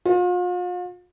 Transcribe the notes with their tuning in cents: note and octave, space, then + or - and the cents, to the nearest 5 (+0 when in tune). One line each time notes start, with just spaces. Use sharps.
F4 +40